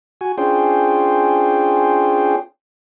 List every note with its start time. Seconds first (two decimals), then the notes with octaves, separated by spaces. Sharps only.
0.21 F#4 G#5
0.38 C#4 D4 F4 G#4 C5 G5